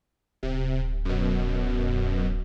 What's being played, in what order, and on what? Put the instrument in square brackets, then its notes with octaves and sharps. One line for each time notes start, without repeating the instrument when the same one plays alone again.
[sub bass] D1 [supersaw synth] C3
[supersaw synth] F#2 B2